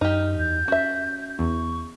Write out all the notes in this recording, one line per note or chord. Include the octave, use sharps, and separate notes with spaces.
F#2 D#4 G4 F6
E2 G6
C#4 F#4 E5
E2 C#6